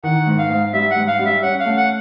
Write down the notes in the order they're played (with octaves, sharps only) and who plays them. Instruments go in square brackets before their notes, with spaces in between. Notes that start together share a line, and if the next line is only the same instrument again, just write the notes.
[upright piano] D#3 [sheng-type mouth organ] F#5
[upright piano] G#2
[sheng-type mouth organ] F5
[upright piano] G#2
[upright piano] G3 [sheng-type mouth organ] E5
[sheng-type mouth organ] F#5
[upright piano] G#2
[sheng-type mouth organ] F5
[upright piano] G3
[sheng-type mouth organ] E5
[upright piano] C#4 [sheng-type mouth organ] F#5
[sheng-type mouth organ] F5
[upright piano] A3
[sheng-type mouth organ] F#5